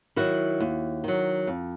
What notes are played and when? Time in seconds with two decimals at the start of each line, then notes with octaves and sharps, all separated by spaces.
0.16 D#3 F#3 E4 F#4
0.60 D#2
1.04 D#3 F#3
1.47 F2